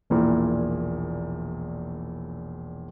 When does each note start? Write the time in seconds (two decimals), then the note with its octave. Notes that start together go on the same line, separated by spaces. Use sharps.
0.10 E1 A#1 A#2 E4 A#4